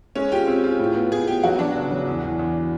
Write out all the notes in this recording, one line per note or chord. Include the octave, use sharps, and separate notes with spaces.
G#3 C#4
F4 G4
C4
F4
A2
B3
A2 G#4
B3 G4
F#3 F#4
F#3 D4
C#3
F#3
E2
E2
E2